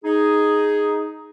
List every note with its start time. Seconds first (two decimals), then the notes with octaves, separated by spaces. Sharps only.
0.05 D#4 G#4